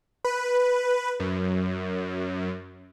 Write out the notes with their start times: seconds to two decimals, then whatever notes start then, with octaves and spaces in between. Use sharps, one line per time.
0.25 B4
1.20 F#2